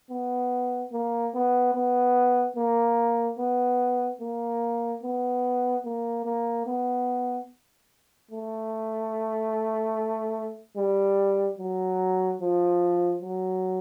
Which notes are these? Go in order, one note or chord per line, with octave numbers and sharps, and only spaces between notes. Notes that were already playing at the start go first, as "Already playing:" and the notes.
B3
A#3
B3
B3
A#3
B3
A#3
B3
A#3
A#3
B3
A3
G3
F#3
F3
F#3